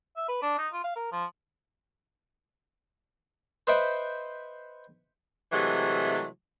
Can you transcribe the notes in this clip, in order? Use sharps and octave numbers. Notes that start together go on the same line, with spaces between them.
E5
B4
D4
D#4
F4
F5
A#4
F3
B4 C5 D#5 E5 F#5 G5
C3 E3 F#3 G#3 A3